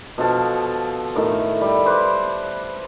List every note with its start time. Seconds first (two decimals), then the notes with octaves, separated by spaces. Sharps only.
0.18 B2 F3 A4 F5
1.16 A2 D#3 E5
1.61 G3
1.85 B4 C5 D6